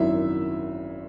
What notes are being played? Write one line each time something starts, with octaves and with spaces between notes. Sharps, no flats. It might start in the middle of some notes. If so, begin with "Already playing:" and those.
Already playing: G#1 F#2 D#3 E4 E5